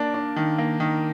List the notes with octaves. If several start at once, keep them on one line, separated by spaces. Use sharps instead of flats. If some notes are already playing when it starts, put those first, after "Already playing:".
Already playing: A#3 D4 D6
D4
D#3
A#3
D#3